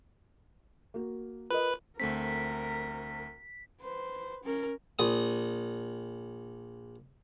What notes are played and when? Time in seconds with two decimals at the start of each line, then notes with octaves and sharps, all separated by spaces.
0.94 A#3 F#4
1.50 F4 A#4 B4 D#5
2.00 D2 A3 C4 A#4 B6
3.82 B4 C5
4.44 C#4 A#4
4.99 A#1 D#6